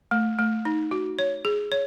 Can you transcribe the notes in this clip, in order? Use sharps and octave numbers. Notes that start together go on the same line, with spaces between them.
A3
A3
D#4
F#4
C#5
G#4
C#5